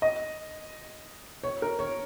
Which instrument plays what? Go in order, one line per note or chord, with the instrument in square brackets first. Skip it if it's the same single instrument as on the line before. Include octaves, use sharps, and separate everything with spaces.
[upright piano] D#5
C#5
A#4
C#5